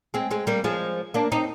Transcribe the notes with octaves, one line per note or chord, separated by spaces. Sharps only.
G#3 C4
G#3 C4
G3 A#3
F3 G#3
A#3 D4
C4 D#4